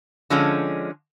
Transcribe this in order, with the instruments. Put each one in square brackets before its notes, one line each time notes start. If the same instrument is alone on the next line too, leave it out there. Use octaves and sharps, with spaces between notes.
[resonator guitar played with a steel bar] D3 F3 G#3 C#4